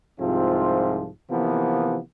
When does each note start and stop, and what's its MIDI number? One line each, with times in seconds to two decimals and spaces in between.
0.19 1.07 36
0.19 1.07 44
0.19 1.07 48
0.19 1.07 53
0.19 1.07 60
0.19 1.07 65
1.30 1.98 48
1.30 1.98 52
1.30 1.98 53
1.30 1.98 58
1.30 1.98 59